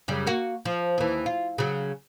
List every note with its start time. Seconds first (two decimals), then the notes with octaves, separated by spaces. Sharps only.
0.08 F#2 C#3 G3
0.27 A#3 F#4
0.65 F3
0.98 D#2 E3
1.26 F4
1.58 C#3 F#3